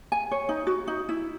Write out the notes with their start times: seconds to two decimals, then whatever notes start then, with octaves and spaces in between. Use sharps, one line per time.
0.12 G#5
0.31 C#5
0.49 D#4
0.67 F#4
0.87 D#4
1.09 E4